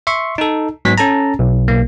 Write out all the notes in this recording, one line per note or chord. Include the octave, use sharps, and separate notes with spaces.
E5 C6 C#6
D#4 A4
G#2 F#3 B3 B6
C#4 A4 A5 A#5
B1
B1 A#3